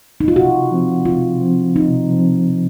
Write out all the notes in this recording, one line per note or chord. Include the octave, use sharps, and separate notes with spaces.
D#4
F4
C3 F#4
F3 C4
C3 F4
F3 C4
C3 D#4
F3 C4
C3